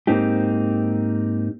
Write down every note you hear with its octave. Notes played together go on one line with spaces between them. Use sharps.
G#2 A#3 C4 D#4 G4